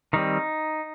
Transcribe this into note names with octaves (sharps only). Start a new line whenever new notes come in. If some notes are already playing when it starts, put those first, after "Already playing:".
D#3 G3 C4 D#4